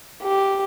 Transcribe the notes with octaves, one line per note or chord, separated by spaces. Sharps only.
G4